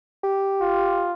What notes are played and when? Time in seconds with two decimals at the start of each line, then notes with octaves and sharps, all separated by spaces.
0.24 G4
0.61 F4